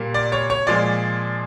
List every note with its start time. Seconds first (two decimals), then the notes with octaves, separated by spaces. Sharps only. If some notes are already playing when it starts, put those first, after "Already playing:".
Already playing: A#2 G3 A#3
0.14 D5
0.32 C#5
0.50 C#5
0.67 A#2 F3 G#3 D5